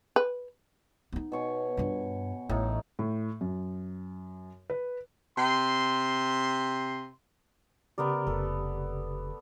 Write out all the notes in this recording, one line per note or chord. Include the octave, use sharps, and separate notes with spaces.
B4
B3 D#4
B2 C#5 G#5
G2 F4
A1 A2 D#4
A2
F#2
B4
C3 C6
C#3 B3 G4 A#4 D5
F1 A4 B4